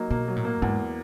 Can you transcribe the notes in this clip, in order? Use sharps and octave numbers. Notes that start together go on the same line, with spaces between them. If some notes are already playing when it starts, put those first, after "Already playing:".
Already playing: F#3 A#3 D#4
B2 A#3
F#3
A2
A#3
E2 G#2